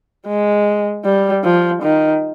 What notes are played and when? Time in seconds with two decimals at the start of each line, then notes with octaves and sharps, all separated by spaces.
0.26 G#3
1.05 G3
1.44 F3
1.82 D#3